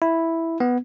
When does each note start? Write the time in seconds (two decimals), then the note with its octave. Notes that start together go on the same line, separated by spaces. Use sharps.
0.02 E4
0.60 B3